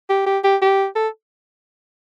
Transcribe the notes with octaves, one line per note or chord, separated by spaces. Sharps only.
G4
G4
G4
G4
A4